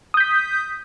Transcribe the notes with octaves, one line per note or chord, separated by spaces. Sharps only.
D#6 G6 B6